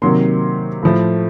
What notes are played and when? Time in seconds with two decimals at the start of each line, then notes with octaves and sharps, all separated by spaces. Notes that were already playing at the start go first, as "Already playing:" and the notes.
0.02 C3 D#3 F#3 A#3 C6
0.83 A2 F3 A3